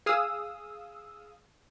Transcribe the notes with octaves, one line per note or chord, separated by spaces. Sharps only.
G#4 F5 D#6 E6